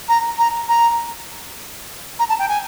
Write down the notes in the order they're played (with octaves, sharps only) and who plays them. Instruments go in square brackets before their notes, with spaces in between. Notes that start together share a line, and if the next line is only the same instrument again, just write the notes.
[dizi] A#5
A#5
A#5
A#5
A5
G5
G#5